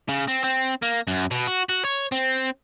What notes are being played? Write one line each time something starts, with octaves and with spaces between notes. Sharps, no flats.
C#3
C4
C4
A#3
F#2
B2
F#4
F#4
C#5
C4